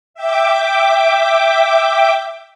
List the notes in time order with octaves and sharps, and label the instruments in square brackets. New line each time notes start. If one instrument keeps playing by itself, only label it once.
[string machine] E5 G5 D6